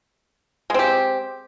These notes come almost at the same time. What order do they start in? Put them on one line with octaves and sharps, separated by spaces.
G#3 C4 G4